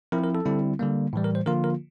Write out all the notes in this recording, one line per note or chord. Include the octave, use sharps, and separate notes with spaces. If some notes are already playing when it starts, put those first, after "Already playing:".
F3 C4 E4 A#4
A#4
A4
D3 G3 C4 E4
D3 G3 A#3
A2 E3 G3
A#4
C5
D3 F3 A#3 F4 A#4
A#4